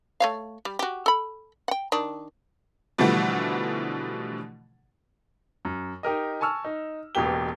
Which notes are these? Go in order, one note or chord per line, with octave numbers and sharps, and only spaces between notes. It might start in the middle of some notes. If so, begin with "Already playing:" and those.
A3 C#5 F5
G3
F#4 G4
A4 B5
F#5 G5
D#3 D4
B2 D3 E3 F3 G3 A3
F#2
D#4 G4 A#4 D#5
G#5 A5 C#6 E6 F6
D#4
E1 A1 B2 A#3 G4 G7